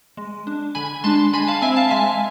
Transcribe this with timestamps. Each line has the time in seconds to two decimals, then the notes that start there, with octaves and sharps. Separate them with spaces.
0.17 G#3
0.47 D4
0.75 D3 G#5 B5
1.04 G#3 D4 A5 C6
1.33 G#3 G#5 B5
1.47 F5 A5
1.62 C4 E5 G#5
1.76 F5 A5
1.91 G#3 E5 G#5